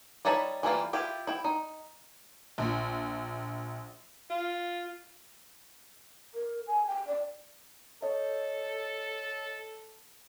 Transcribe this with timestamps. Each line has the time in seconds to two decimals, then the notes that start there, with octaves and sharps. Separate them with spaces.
0.25 G3 D#4 C#5 A5 B5
0.63 E3 G3 A#3 F4
0.93 E4 F4 G4
1.27 E4 G5
1.44 D#4
2.58 A#1
4.30 F4
6.34 A#4
6.67 G#5
6.87 G5
7.07 D5
8.02 A4 C#5 D#5